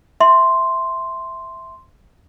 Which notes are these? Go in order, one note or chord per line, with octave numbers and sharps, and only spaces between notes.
E5 C6